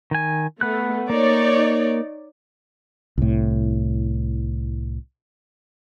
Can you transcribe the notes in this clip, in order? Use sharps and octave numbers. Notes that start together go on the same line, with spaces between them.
D#3 G#5
A3 B3 F#6
A#3 D#4 C#5 D5
C2 A2